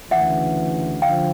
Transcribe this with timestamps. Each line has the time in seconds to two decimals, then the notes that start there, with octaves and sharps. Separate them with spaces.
0.11 D2 C#3 E3 E5 F#5
1.02 D3 F3 F5 G5